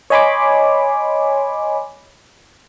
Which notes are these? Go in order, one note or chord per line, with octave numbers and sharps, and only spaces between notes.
C#5 D#5 G#5 B5 C6 D6